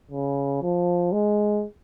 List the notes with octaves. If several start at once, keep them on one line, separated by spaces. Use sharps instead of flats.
C#3
F3
G#3